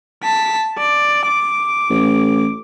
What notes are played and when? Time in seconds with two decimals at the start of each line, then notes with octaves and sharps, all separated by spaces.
0.23 A5 B6
0.78 D5
1.26 D6
1.90 A1